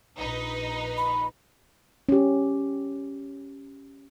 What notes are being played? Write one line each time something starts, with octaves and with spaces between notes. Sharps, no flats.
A#1 D#4 B4
B5
C#4 G4